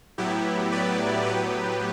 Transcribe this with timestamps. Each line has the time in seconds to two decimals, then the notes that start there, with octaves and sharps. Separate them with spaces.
0.18 A2 F#3 B3 E4 G4
0.72 B4 D5
1.26 A2 F#3 B3 G4 B4